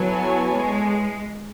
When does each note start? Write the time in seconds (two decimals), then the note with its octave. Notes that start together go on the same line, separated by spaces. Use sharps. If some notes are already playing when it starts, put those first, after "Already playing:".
Already playing: F#3 B3 E4 A4 C#5 G#5
0.52 G#3